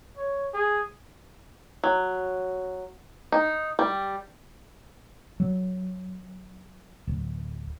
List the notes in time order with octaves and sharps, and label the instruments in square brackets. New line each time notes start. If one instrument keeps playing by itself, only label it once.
[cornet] C#5
G#4
[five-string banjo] F#3
D#4
G3
[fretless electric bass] F#3
D1